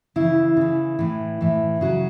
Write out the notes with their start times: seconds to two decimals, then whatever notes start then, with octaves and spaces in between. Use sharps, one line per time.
0.16 C#3 E3 E4
0.57 C#3 E3
0.99 A2 E3
1.41 A2 E3
1.81 C#3 F#3 F#4